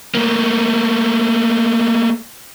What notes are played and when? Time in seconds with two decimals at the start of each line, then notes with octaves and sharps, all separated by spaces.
0.15 A3 A#3